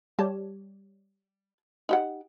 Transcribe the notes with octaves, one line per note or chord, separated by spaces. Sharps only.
G3 G4 C#5 A5
D#4 G4 F#5